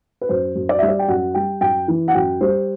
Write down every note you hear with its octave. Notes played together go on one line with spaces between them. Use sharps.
B4
F#2 C5
F#2
D5
G3 E5
D5
G5
F#2 F#5
G3 G5
F#2 G5
E3
F#5
F#2 G5
G3 C5